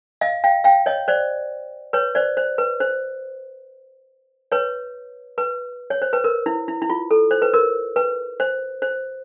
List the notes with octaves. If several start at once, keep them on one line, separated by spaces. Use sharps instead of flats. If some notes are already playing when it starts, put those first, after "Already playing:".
D#5 F5
F5 G5
F5 G5
C#5 D#5
C5 D5
B4 C#5
C5 D5
C5
B4
C5
B4 C#5
B4
C#5
C5
B4
A#4
E4
E4
E4
F4
A4
C5
B4
A#4
B4
C5
C5